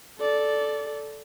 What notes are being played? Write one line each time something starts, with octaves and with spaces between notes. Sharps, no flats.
A4 D5